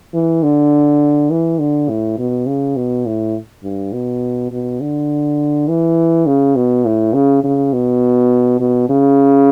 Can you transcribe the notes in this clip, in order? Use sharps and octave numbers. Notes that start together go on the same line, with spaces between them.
E3
D3
E3
D3
A2
B2
C#3
B2
A2
G2
B2
B2
D3
E3
C#3
B2
A2
C#3
C#3
B2
B2
C#3